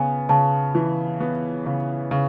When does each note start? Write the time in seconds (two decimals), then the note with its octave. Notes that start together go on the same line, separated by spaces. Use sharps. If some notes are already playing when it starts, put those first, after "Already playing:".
Already playing: C#3 B3 G#5
0.29 C#3 A5
0.75 E3
1.20 B3
1.66 C#3
2.11 C#3